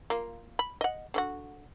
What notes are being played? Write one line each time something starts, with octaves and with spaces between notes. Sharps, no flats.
A#3 F4
B5
D#5 F#5
D3 C#4 F#4